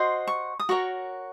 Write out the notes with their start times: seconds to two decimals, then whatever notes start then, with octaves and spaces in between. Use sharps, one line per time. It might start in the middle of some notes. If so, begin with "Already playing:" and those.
Already playing: F#4 C5 D#5 C6
0.28 C#6
0.60 D#6
0.69 F#4 A#4 C#5 C#6